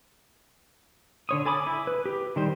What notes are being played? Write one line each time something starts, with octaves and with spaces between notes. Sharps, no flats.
D3 C#5 D#6
A4 G#5 B5 D6 D#6
E4
B4
G4
D#3 G3 C5